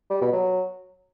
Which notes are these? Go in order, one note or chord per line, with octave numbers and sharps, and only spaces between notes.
G3
B2
F#3